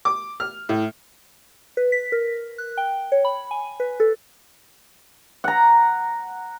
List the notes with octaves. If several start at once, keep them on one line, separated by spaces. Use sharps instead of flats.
D6
F6
A2
B4
B6
A#4
F#6
G5
C#5
B5
G#5
B4
A4
F#5 A#5